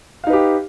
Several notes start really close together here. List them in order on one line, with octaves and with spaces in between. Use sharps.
F5 D#4 B4 G4